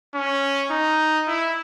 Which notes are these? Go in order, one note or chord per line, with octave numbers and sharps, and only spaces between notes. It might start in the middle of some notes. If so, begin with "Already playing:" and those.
C#4
D#4
E4